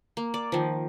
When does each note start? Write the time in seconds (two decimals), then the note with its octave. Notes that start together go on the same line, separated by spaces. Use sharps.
0.17 A#3
0.34 D5
0.52 D#3 F3